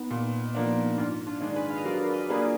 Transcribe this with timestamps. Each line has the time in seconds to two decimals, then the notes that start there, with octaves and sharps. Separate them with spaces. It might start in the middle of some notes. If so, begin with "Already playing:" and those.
Already playing: B3 D#4
0.11 A#2
0.55 F3 A#3 D4
0.97 G#2 D4 F4
1.27 D4 F4
1.41 D#3 G#3 D4
1.56 G#4 B4
1.70 F5
1.77 D#5
1.85 F#3 A#4 D5
2.13 B4 D#5
2.29 A#3 D4 G#4 B4